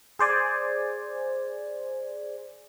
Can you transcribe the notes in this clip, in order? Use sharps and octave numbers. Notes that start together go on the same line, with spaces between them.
G#4 C5 D5 G#5